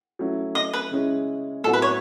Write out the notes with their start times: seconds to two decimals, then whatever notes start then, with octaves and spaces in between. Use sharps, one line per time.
0.19 F#3 A3 C#4 E4
0.55 D#5
0.73 B4
0.91 C#3 G#3 C#4 E4
1.64 A2 F#3 B3 F#4 A4
1.73 B4
1.82 C#5